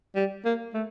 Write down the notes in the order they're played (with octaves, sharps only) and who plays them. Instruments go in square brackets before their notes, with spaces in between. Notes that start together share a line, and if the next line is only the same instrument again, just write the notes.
[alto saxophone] G3
A#3
A3